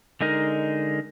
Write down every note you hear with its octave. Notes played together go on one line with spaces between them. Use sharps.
D3 G#3 D#4 A#4